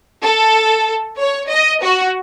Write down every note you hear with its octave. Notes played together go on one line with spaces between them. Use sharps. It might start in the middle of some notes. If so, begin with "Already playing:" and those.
A4
C#5
D#5
F#4